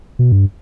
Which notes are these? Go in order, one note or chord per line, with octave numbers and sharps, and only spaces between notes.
B2
G2